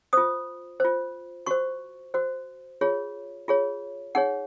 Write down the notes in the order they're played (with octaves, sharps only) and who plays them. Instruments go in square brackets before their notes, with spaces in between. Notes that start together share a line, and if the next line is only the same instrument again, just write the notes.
[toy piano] F4 C5 D#6
F4 C5
F#4 C5 C#6
F#4 C5
F4 G#4 C#5
F4 G#4 C#5
D#4 G#4 C#5 F#5